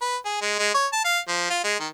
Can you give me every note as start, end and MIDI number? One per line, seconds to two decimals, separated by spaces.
0.02 0.16 71
0.25 0.37 68
0.42 0.55 56
0.59 0.71 56
0.74 0.87 73
0.93 1.01 81
1.05 1.19 77
1.28 1.47 53
1.50 1.59 65
1.64 1.79 56
1.80 1.88 51